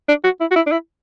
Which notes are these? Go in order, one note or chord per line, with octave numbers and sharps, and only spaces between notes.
D4
F#4
E4
F#4
E4
D4
E4